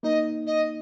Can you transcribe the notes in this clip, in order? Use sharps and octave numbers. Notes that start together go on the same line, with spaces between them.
A#3 D#4 D#5
D#5